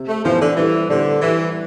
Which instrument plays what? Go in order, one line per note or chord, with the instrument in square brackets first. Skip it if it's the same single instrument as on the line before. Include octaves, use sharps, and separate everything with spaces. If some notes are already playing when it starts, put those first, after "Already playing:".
Already playing: [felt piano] C3
[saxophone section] A3
[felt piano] E3 B3 E4 [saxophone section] F3
[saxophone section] D3
[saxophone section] E3 [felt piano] G3
[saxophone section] D3 [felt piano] D4 G4 C5
[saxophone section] E3 [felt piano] G3